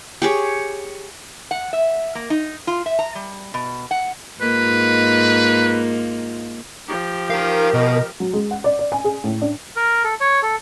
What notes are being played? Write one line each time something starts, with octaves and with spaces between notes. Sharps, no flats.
G4 G#4 C#5
F#5
E5
A#3
D#4
F4
E5
A#5
G3
B2
F#5
G#2 A#3 D#4 F4 B4
F3 G4
D#4 A#4 F5
B2 D#5
F#3
G#3
F#5
D5
D5
G#5
G#4
A2
D4
A#4
A4
C#5
A4